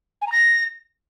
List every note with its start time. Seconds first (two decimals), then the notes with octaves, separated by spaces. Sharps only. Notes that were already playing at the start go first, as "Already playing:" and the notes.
0.22 G#5
0.27 A#5
0.32 A#6